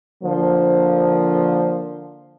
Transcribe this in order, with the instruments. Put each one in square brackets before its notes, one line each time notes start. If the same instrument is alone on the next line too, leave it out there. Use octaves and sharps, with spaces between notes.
[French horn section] D3 F3 A#3 C5